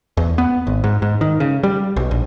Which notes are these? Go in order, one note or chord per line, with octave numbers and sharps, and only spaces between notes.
E2
B3
G#1
G#2
G#2
D#3
C#3
G3
B1
A#1